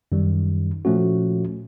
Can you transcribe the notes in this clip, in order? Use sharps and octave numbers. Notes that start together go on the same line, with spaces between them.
F#2 D#3 G3
A#2 F3 A3 C#4 F#4